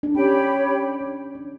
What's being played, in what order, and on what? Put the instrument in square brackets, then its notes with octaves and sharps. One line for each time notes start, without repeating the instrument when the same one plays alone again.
[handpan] D4
[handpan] C#4 [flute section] G4 C#5 G5 B5
[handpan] D4
D4